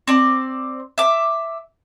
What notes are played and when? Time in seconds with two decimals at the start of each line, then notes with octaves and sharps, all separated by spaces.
0.07 C4 D5
0.98 E5 D6